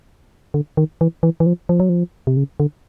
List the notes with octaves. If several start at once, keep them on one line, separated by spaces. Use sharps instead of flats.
D3
D#3
E3
E3
E3
F3
F3
F#3
F3
C3
C#3
D3